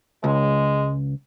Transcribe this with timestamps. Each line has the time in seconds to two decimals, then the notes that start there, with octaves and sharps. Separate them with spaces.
0.24 C#2 G#3